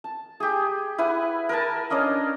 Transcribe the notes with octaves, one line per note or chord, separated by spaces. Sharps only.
A5
G4 G#4
E4 B4 F#5 G#5
A#4 B4 G#5 A5
C#4 D4 D#5 F5